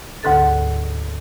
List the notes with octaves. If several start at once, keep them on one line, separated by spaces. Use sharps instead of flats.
D2 G#2 D3 A4 A6